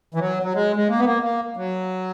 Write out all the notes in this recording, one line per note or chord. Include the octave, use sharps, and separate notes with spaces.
E3
F#3
F#3
G#3
G#3
A#3
B3
A#3
A#3
F#3